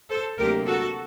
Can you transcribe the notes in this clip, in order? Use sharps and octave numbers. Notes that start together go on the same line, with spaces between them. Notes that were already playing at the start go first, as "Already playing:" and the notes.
A4 C5
D2 C3 F#3 A#3 G4 A#4
F#4 A4